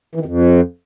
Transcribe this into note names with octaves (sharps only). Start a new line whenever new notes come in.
E3
D#3
F2